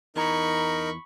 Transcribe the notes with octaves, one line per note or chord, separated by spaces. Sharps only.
E2 D#4 E4 A#4 A#5 B5 C#6